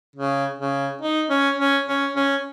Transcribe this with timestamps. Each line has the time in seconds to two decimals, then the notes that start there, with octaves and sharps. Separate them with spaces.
0.16 C#3
0.59 C#3
1.02 D#4
1.30 C#4
1.58 C#4
1.87 C#4
2.16 C#4